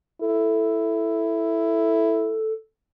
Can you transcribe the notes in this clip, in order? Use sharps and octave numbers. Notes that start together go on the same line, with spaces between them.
E4 A4